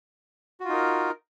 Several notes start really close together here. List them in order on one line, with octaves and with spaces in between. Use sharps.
F#4 F4 D#4 A#4